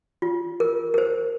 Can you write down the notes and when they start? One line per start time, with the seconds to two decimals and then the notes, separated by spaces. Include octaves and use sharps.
0.22 F4
0.60 A#4
0.94 A#4
0.98 C5